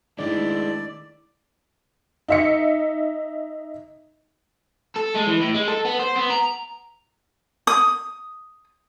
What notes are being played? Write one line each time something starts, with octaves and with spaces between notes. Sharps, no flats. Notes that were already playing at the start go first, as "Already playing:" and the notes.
D#3 G#3 A3 D4 E4 D5
D#4 E5 C#7
A4
G#3
E3
A2
G#3
A4
B3
C5
B3
A#5
D#6